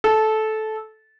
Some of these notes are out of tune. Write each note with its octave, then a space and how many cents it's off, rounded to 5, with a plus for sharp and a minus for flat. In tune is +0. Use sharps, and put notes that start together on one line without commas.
A4 -15